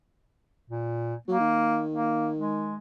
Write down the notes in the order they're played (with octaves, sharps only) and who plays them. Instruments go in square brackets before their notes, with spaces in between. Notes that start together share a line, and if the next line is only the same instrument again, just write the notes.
[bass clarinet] A#2
[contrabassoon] F#3 [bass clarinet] A#3
[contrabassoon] D#3
[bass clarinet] A#3
G#3